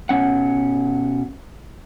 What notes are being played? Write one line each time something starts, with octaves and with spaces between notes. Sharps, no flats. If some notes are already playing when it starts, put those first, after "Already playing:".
B2 C#4 F#5